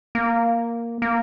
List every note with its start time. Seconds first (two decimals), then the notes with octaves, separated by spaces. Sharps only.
0.15 A#3
1.02 A#3